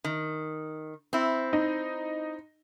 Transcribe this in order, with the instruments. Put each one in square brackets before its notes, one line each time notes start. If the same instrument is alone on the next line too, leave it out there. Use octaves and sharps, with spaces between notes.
[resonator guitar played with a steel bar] D#3
C4 E4
[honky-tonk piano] D#4